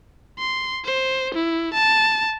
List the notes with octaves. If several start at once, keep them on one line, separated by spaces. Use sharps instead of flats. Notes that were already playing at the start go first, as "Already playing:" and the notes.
C6
C5
E4
A5